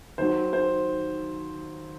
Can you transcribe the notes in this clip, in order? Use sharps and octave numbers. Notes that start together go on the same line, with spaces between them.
D#2 D#3 F#3 C5
C5